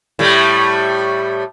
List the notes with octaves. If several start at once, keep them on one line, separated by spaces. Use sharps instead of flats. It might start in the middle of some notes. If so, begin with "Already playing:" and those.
A2 G3 A3